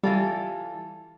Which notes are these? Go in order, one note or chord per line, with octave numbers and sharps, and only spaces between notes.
E3 G3 F4 A4